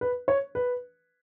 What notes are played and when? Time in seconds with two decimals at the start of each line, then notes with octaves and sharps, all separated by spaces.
0.01 B4
0.28 C#5
0.55 B4